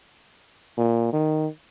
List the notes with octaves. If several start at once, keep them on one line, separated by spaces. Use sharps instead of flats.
A#2
D#3